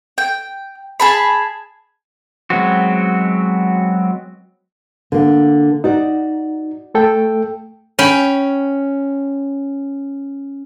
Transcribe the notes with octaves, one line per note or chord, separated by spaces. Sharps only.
G5
G#4 A5 B5
F#3 G#3 B3 C4 F#4
D3 A#3
D#4 F#4 D5
A3 A4 G5
C#4 G5 B5